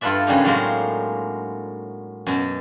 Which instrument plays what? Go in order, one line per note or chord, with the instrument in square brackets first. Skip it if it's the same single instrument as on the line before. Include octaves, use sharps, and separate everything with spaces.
[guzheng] G2 F4 A4 B4 D5 E5
F#2 C#3 G3 D4 D#4
A2 F#3 G#3 A#3 C4
F#2 B2